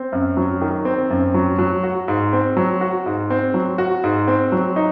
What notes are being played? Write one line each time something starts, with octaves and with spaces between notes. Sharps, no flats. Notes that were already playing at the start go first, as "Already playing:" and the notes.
Already playing: C4
F#2
F#3
D#3
C4
F#2
F#3
F#3
F#4
G#2
C4
F#3
F#4
G#2
C4
F#3
F#4
G#2
C4
F#3
D#4